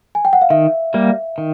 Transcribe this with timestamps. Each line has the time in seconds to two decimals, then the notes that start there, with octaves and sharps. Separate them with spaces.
0.15 G#5
0.25 G5
0.33 F#5
0.41 F5
0.50 D#3 E5
0.94 G3 A#3
1.38 D#3